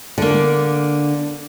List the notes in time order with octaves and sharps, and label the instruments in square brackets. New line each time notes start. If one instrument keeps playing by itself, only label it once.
[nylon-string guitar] D3 A#3